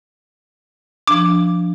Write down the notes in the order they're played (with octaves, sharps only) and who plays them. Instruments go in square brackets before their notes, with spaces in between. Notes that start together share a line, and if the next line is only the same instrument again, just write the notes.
[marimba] F3 D4 [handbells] D6